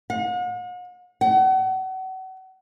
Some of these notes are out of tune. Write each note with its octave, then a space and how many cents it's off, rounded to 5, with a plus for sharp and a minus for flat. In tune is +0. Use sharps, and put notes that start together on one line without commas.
F#5 -45
F#5 +35